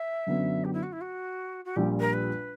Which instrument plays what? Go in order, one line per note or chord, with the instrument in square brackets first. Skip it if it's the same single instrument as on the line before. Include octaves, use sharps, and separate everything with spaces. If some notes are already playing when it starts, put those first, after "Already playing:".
Already playing: [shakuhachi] E5
[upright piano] F#2 D3 F#3 B3
[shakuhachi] G4
E4
F#4
E4
F#4
F#4
[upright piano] A#1 A#2 G3 [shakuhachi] G4
[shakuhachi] A#4
B4